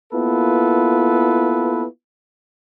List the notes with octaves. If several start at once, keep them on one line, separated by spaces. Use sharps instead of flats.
A#3 B3 E4 F4 A4 B4